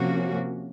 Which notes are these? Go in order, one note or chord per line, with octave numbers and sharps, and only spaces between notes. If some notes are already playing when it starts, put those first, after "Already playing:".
Already playing: C3 F3 A#3 C#4 F#4